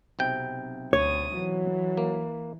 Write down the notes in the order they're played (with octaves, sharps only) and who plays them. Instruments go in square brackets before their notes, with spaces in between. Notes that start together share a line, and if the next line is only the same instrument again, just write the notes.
[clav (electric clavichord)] B1 C3 G5
[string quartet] D2 D#6 [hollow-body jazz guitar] C#5
[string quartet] E3 [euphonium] F#3
[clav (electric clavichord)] A#3